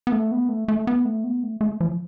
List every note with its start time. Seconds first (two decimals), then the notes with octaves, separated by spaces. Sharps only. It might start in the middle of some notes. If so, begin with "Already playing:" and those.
0.07 B3
0.12 A3
0.31 B3
0.49 A3
0.68 A3
0.87 B3
1.05 A3
1.24 B3
1.43 A3
1.61 A3
1.81 F3